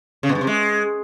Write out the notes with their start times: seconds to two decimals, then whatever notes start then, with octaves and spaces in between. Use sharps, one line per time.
0.23 C#3
0.29 B2
0.35 G2
0.41 C3
0.47 G#3